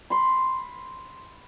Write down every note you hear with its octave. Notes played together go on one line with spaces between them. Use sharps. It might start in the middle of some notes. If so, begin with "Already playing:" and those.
B5 C6